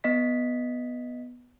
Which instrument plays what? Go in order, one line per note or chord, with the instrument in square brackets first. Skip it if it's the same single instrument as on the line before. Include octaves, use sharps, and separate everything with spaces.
[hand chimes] B3 D#5 B6